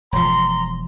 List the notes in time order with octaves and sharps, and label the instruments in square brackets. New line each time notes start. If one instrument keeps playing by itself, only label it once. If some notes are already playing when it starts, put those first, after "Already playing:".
[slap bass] E1 F3 [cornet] A#5 [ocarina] C6